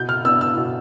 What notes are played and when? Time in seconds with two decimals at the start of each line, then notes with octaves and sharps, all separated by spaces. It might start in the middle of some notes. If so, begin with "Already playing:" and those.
Already playing: B2 G6
0.09 F6
0.25 B3 D4 E6
0.41 E6
0.57 B2